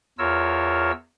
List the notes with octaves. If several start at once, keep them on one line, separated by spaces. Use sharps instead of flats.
E2 F4 A#4 C#5 E6